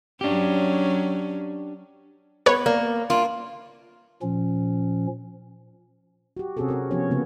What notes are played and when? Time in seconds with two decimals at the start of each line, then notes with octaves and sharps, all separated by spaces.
0.21 F#3 C#4 D4 G4
2.46 B3 B4 C#5
2.66 A#3 D5
3.10 A#3 D4 F4
4.22 A#2 F3 C#4
6.37 F#4 G4
6.57 C3 C4 C#4 F#4 G#4 A4
6.68 C4 F#4 A#4
6.91 F3 B3 C#4 F#4 C#5
7.11 C#3 A#3 B3